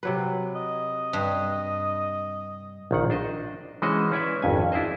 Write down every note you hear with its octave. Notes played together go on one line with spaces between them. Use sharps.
C3 F#3 B4
D#5
G2
A#1 D#3 F#5
D4 C5 D#5
E3 G#3 C#4 F#4 C5 D#5
C#4 E4 B4 D5 E5
G#1 F2 C#4 G#5
D4 E4 G#4 C5 D#5